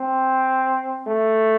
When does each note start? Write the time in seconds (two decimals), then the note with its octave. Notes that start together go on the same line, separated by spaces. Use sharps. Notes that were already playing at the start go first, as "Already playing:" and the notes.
Already playing: C4
1.07 A3